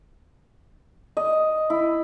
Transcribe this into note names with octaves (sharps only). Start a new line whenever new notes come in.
D#5
E4